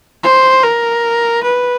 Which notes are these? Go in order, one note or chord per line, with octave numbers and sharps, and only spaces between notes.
C5
A#4
B4